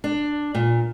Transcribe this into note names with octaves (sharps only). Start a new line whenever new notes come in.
D4
A#2